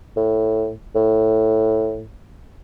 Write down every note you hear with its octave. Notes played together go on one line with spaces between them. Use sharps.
A2
A2